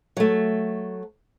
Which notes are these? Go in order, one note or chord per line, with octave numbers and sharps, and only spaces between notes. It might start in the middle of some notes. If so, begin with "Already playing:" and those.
F#3 A3